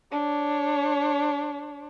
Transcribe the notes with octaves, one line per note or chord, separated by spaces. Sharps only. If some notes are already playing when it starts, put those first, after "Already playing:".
D4 C#5